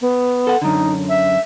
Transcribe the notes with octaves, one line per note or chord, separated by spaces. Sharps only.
B3
A4 F#5
F#2 D3 D#4
E5